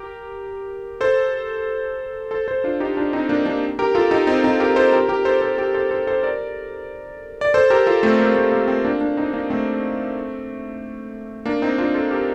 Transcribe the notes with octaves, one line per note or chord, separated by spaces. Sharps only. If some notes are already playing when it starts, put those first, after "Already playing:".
Already playing: G4 A#4
A4 C5
A4 C5
A4 C5
D4 F4
D#4 G4
D4 F4
C4 D#4
A#3 D4
A#3 D4
G4 A#4
F4 A4
D#4 G4
C4 D#4
C4 D#4
G4 A#4
A4 C5
G4 A#4
G4 A#4
A4 C5
A4 C5
G4 A#4
A4 C5
A4 C5
A4 C5
A#4 D5
D5
A4 C5
G4 A#4
F4 A4
A3 C4
A#3
A3
A#3
A3 C4
A#3 D4
A#3 D4
C4 D#4
A#3 D4
A3 C4
A#3 D4
C4 D#4
D4 F4
F4 A4
G4 A#4